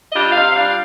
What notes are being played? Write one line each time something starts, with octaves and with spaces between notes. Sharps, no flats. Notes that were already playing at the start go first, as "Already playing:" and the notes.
G3 D4 F4 D#5
C3 F5
G3 D4 F4 F5